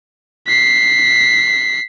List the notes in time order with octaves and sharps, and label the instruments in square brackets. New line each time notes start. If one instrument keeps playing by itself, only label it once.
[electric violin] B6 C7